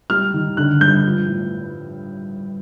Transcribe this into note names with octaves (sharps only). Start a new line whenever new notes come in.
G3 F6
D#3
D3 F#6
G2 G6
F3
A2